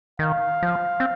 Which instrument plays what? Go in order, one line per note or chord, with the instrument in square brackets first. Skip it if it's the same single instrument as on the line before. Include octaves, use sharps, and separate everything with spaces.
[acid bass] D#3 [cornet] F5
[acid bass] F3
C4